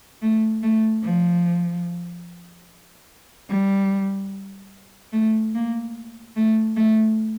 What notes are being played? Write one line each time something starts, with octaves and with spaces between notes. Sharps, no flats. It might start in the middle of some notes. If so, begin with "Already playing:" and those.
A3
A3
F3
G3
A3
A#3
A3
A3